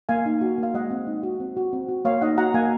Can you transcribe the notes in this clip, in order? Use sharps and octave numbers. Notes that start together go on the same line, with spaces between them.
A#3 F5 G#5
D#4
F#4
A#3 F5
G#3 D#5 F#5
C4
D#4
F#4
C4
F#4
C4
F#4
A#3 C#5 F5
D#4 D#5 F#5
F#4 F#5 A#5
A#3 F5 G#5